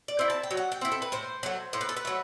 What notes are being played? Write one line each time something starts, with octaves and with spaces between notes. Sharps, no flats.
D5
C4 E4
A5
G5
F#3
F#5
G5
C4 E4
A4
B4
A2 C5
F#3 A3
A2 C5
B4
A4
B4
F#3 A3